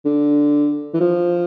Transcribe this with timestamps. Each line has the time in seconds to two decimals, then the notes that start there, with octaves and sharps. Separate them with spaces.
0.05 D3
0.94 E3
1.00 F3